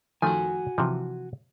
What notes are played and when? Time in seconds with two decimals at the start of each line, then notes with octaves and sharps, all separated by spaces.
0.22 D#3 F3 A3 F#4 G#5
0.78 C3 E3 F3